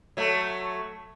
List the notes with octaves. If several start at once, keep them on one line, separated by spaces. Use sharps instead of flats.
F#3 A3